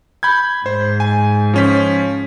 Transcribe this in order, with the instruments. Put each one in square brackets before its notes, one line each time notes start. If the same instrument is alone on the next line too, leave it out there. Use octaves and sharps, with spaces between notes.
[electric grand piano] B5 G6 G#6
[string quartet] G#2 [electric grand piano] C5
[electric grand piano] G#5
F3 C#4 B6